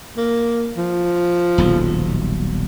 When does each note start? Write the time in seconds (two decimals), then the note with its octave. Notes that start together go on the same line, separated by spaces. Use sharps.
0.17 A#3
0.77 F3
1.58 D#1 B1